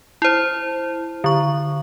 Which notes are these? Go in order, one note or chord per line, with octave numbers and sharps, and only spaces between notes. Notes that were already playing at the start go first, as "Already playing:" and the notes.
E4 C5
D3 C#6